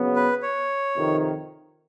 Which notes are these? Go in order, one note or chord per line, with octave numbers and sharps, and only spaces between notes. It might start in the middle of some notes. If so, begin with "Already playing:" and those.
Already playing: C#3 F#3 B3
B4
C#5
F2 C3 D#3